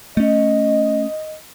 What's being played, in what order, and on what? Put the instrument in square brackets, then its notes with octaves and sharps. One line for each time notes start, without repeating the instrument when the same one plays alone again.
[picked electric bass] A3 C#4 [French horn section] D#5